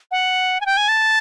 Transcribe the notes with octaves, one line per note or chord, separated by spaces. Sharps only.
F#5
G#5
G5
G#5
A5